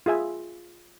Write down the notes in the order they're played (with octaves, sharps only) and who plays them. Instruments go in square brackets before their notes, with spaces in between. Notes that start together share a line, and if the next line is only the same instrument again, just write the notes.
[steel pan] F4 G#4 E5 G#5